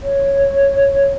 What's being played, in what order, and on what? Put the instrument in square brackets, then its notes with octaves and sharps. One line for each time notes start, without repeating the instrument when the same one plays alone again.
[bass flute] C#5